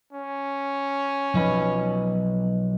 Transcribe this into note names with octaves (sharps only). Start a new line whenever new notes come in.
C#4
B1 F3 F#3 D#4 B4